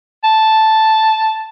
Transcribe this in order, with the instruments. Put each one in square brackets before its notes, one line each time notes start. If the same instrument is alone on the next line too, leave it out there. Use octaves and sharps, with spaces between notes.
[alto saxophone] A5